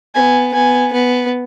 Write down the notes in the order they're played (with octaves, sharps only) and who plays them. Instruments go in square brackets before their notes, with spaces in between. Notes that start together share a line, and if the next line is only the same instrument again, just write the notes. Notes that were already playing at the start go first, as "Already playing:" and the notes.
[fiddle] B3 [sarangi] G#5
[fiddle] B3 [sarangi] G#5
[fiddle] B3